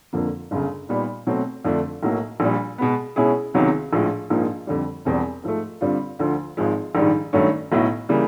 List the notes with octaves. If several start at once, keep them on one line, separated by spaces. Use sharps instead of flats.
F2 D3 F3 A#3
G1 F#2 C#3
A#2 G3 B3 D#4
B2 F#3 A3 C4
F2 D3 F3 A3 D4
B1 A2 F#3 A#3
A#1 A#2 G3
B2 G#3 B3
B2 G#3 C#4 E4 G#4
C#2 C3 D#3 F#3 B3
A#1 A2 F3 G#3
A#1 G#2 F3 A#3
F2 D3 G3
E1 E2 B2 G3 C4
G#2 F3 A3
G2 D3 G3 C4 F4
D2 D3 F3
G#1 G#2 F3 G#3
A#1 G#2 D#3 G3
G2 D#3 F#3 A3 C#4
B1 A2 F#3 B3 E4
C#3 E3 G3 A#3